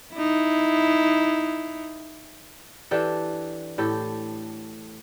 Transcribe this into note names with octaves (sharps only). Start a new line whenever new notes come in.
D#4 E4
E3 D4 G4 A4
A2 G4 A4